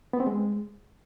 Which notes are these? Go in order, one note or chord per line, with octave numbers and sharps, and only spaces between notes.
B3
C4
G#3